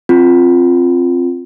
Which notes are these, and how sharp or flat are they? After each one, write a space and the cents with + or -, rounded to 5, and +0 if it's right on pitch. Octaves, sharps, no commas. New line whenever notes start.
C4 +15 F4 +0